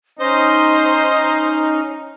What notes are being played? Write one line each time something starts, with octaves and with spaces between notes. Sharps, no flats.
C#4 D#4 C5 D#5